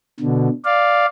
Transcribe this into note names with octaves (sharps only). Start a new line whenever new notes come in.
B2 D3
D5 F5